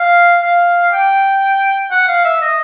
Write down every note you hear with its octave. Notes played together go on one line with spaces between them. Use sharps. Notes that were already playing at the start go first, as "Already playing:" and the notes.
Already playing: F5
F5
G5
F#5
F5
E5
D#5